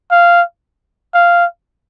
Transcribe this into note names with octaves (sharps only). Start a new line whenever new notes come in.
F5
F5